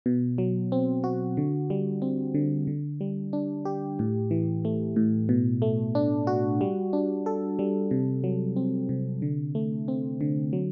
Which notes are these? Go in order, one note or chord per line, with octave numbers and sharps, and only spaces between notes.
B2
F#3
C4
F#4
D3
G3
C4
D3
D3
G3
D4
G4
A2
E3
A3
A2
B2
A3
D4
F#4
G3
D4
A4
G3
C3
F#3
C4
C3
D3
A3
C4
D3
F#3